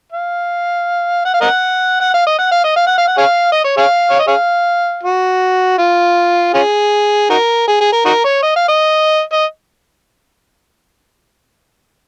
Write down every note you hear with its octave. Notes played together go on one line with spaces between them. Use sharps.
F5
F#5
F5
A#4 D#5 F#5
F#5
F5
D#5
F#5
F5
D#5
F5
F#5
F5
F#5
G#4 C#5 F5
D#5
C#5
G#4 C#5 F5
C#5
D#5
G#4 C#5 F5
F#4
F4
C#4 F4 G#4
D#4 F#4 A#4
G#4
G#4
A#4
D#4 F#4 A#4
C#5
D#5
F5
D#5
D#5